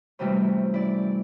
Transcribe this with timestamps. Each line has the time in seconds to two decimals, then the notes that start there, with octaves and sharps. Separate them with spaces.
0.19 F#2 C3 E3 G3 A3 C#4
0.74 E4 D5